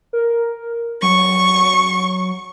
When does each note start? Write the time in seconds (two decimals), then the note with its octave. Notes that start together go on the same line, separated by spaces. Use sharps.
0.13 A#4
1.02 F#3 C#6